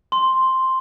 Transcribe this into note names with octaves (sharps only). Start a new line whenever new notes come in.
C6